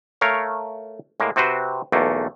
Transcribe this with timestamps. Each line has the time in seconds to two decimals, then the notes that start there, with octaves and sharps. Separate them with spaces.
0.21 A3 A#4 C#5 F5
1.20 A2 G#3 A#3
1.36 C3 C4 F#4 B4 C5
1.92 B1 E2 A3 A#3